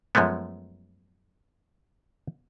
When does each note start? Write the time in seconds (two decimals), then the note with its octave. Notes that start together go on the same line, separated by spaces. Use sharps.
0.15 F#2 F3 G#3 A3 B3